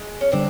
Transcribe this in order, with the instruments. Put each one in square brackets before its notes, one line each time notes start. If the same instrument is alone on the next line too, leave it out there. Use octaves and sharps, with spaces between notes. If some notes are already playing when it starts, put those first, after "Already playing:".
Already playing: [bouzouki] G#3
C#4
[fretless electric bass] D3 G3 [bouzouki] C4 D4